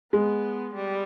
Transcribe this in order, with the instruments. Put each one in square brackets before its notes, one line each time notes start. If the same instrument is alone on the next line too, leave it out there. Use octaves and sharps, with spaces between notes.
[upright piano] G#3 [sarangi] B3
[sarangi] G3